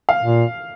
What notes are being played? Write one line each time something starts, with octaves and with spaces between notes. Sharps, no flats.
F5
A#2